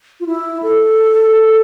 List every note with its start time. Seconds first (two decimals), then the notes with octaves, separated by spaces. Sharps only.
0.20 F4
0.26 E4
0.63 A4